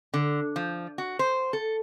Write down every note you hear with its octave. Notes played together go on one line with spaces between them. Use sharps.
D3
F3
F#4
C5
A4